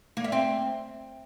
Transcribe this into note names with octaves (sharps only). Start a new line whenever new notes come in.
A#3
E5
C4